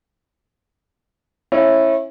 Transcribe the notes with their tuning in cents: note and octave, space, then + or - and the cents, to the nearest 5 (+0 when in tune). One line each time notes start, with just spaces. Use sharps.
C#4 -30 E4 +0